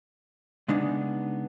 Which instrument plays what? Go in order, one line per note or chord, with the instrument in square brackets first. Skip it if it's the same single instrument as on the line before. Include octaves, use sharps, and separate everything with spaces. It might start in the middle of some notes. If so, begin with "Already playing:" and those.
[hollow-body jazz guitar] C#3 G#3 B3 D4 D#4